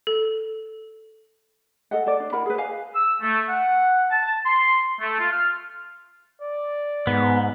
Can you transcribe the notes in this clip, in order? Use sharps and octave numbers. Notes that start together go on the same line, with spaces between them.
A4
A4 D#5 F#5
A4 D5
D4
E4 A#4 F#5 B5
G#4 B4
D#5 F5 G#5
E6
A3
F#5
A5
C6
A3
F4
F6
D5
G#2 B3